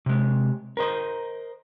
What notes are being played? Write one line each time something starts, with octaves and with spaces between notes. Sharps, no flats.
C3 G#3
A#4 C5 D#5